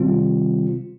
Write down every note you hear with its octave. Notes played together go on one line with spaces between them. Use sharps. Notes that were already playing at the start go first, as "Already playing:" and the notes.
Already playing: C3 D#3 G3 C4 F4